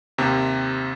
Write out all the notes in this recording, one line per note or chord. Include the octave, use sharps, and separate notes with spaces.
D#2 C3